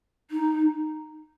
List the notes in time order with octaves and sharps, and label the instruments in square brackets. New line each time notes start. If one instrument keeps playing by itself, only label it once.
[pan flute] D#4